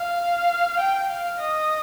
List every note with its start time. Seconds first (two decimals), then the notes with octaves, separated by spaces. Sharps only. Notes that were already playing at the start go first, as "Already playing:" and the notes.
Already playing: F5
0.80 G5
1.10 F5
1.40 D#5